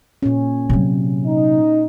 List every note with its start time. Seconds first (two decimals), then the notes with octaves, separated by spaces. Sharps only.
0.23 A#2 C#4
0.70 C3 F#3
1.26 D#4